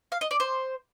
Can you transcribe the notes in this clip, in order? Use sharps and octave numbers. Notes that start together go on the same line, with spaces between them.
F5
D#5
D5
C5